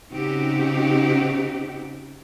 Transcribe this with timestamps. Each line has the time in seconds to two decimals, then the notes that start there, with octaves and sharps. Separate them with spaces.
0.13 C#3 C4 D#4 F#4 G4